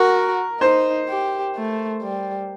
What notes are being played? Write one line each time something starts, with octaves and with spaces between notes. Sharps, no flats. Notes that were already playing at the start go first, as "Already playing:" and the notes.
Already playing: F#4 A#4
D#4 C5
G4
A3
G3